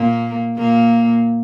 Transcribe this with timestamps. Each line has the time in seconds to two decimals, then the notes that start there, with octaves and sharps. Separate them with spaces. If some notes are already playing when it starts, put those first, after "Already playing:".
Already playing: A#2 A#3
0.57 A#2 A#3